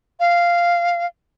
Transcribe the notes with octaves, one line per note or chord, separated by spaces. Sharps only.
F5